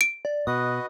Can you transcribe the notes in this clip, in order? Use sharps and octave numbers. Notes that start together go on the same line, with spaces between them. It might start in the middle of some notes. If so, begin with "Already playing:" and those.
D7
D5
B2 F#4 B4 D#5 D#6